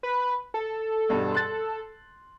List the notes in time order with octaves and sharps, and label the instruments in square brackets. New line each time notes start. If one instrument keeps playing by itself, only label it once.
[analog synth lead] B4
A4
[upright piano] E2 G2 B2
C6 F#6 A6